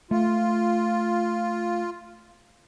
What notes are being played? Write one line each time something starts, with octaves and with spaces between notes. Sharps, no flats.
A3 F4